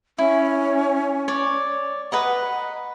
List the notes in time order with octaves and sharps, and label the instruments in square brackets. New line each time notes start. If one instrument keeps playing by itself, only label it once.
[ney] C#4 [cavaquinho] E4
[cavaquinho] C#5 D5
[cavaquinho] B4 D#5 A#5 [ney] F#5